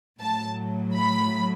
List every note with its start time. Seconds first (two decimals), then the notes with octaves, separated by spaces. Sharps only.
0.20 A2 F#3 A5
0.95 B5